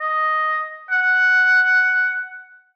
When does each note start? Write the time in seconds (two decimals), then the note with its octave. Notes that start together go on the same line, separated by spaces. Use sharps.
0.01 D#5
0.91 F#5